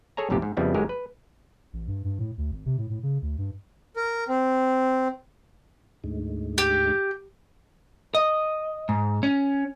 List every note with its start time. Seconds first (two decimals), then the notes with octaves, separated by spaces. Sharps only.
0.17 G#4 A4 C#5 G#5 A#5
0.30 B1 F2 G#2 C3 G4
0.42 G#2
0.57 F2 C#3 G3 B3 C4 E4
0.74 G1 G#2 F#3 G#3 G4 A#4
0.89 B4
1.73 A1
1.88 G2
2.04 G2
2.19 A2
2.38 D2
2.51 G#1
2.66 C3
2.78 A2
2.90 A2
3.03 C#3
3.22 D2
3.38 G2
3.96 A#4
4.29 C4
6.04 D2 G#2
6.58 G4
8.15 D#5
8.89 G#2
9.23 C#4